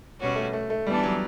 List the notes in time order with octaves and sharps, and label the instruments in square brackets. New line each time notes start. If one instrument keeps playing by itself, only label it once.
[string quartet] B2 G3 C#4 F#4
[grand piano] A3
A3
A3
[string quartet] E3 B3 D4 A4 [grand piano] G3
[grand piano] F#3